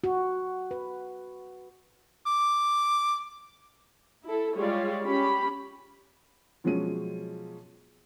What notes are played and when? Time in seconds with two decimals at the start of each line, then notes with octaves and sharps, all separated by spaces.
0.04 F#4
0.71 B4
2.26 D6
4.24 E4 A4
4.56 G3 G#3 F4 C#5 D5
5.06 C#4 G4 B5
6.64 B2 F3 F#3 G#3 C#4 D#7